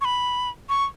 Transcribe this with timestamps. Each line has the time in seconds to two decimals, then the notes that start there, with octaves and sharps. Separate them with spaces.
0.01 C#6
0.05 B5
0.69 C#6